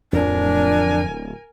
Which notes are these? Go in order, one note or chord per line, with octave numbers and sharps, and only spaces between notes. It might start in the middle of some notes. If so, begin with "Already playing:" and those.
D1 F2 A2 F3 D4 A#4 G#5